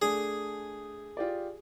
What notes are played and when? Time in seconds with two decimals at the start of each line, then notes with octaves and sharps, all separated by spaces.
0.02 A3 D4 G#4
1.17 F4 G4 D5